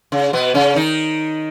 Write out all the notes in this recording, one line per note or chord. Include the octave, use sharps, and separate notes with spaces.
C#3
B2 B3
C#3 C#4
D#3 D#4